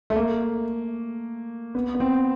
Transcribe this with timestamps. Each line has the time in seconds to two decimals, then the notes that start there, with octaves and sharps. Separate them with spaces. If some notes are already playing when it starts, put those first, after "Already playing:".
0.10 A3
0.16 A#3
1.75 B3
1.95 B3
2.00 C4